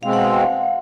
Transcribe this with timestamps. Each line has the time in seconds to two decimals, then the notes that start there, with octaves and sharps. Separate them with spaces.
0.03 B2 G#3 C4 F5
0.13 F#5
0.25 F5